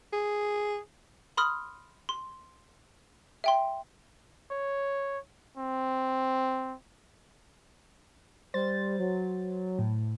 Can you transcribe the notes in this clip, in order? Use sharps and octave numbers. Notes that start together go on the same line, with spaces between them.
G#4
B5 C6 D#6 F6
C6
E5 G5 C6
C#5
C4
G3 C5 A6
F#3
A2